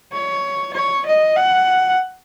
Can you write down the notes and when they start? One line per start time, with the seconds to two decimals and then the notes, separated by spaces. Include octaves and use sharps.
0.12 C#5
0.74 C#5
1.06 D#5
1.37 F#5